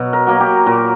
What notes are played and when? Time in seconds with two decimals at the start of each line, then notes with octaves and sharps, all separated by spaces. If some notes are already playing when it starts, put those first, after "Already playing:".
Already playing: B2 F#3 C#5
0.13 A#4
0.27 F#3 A#3
0.40 G4
0.66 A#2 A#4